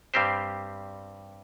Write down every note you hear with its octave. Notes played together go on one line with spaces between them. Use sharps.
G2 G3 C4 G4 C5